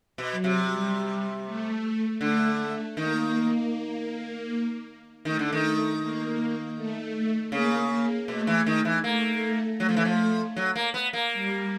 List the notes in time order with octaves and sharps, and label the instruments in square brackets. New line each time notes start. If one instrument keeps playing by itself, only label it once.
[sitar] B2
[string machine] F#3
[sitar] C3
[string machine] G3
A3
[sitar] D3 [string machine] A3
[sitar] D#3 [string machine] A#3
[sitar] D#3 [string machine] A3
[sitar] D3
D#3
[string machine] A#3
A3
[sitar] C#3 [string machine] A#3
[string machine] A#3
[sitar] B2 [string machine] A3
[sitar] E3
D#3
E3
[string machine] A3 [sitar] A#3
[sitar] F#3 [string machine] A3
[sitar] F3
E3
F3
F#3
A#3
B3
A#3
[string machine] G3